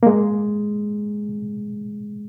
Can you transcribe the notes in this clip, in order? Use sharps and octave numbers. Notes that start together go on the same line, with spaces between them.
A#3
G#3